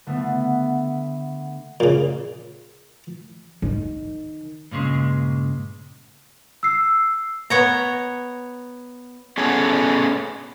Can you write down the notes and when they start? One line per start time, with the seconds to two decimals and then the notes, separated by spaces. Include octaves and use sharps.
0.06 D3 A3 B3
1.80 A#2 C#3
3.62 D#3
4.71 G2 A#2 C#3 G#3
6.63 E6 C7
7.50 B3 C#5 A#5
9.38 B3 C#4 G#4 A4